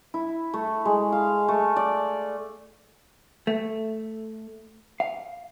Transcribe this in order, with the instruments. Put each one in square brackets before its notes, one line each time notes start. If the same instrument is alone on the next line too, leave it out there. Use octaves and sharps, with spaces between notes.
[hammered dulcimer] E4
A3
G#3
F5
A3
D5
[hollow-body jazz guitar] A3
F5